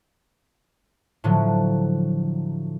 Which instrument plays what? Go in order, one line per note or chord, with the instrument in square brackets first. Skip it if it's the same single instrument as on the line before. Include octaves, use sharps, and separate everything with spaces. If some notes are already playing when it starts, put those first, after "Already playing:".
[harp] A2 D3 F3 F#3